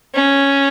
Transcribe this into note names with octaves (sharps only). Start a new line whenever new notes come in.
C#4